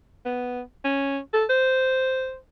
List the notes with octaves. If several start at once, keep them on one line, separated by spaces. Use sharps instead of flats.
B3
C#4
A4
C5